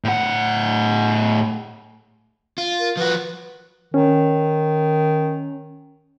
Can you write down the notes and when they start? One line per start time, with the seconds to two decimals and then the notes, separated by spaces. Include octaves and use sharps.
0.04 A2 F#5
2.58 F4
2.79 A#4
2.97 F3 F#4 B4
3.94 D#3 C#4